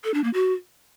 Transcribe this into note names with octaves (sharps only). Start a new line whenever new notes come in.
A4
D4
A#3
F#4